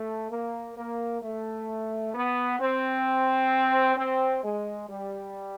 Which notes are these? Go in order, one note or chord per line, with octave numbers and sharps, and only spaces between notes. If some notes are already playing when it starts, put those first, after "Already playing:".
Already playing: A3
A#3
A#3
A3
B3
C4
C4
G#3
G3